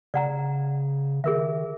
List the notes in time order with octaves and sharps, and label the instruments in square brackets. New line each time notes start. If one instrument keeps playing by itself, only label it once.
[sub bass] C#3 [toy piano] D5 F#5 A#5
[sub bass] D#3 [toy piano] G#4 A#4 E5